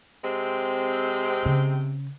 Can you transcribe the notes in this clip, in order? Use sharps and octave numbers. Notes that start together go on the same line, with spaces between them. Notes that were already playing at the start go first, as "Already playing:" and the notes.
C3 G#3 C4
C#3